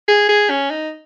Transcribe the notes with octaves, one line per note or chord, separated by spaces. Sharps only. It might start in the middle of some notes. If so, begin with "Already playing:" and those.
G#4
G#4
C#4
D#4